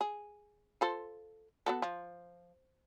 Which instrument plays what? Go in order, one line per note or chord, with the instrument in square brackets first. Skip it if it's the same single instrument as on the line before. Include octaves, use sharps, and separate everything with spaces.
[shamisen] G#4
F4 A4 C5
B3 F#4 A4
F3